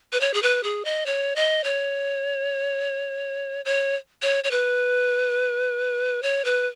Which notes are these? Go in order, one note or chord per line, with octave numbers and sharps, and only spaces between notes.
B4
C#5
G#4
B4
G#4
D#5
C#5
D#5
C#5
C#5
C#5
C#5
B4
C#5
B4